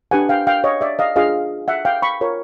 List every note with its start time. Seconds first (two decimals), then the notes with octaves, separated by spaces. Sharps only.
0.11 D4 G4 B4 F#5 G#5
0.29 F5 G5
0.47 F5 G5
0.64 C#5 D#5
0.81 D5 E5
0.99 D#5 F5
1.16 D4 F4 G#4 D#5 F5
1.68 E5 F#5
1.85 F5 G5
2.02 B5 C#6
2.21 F4 A#4 C#5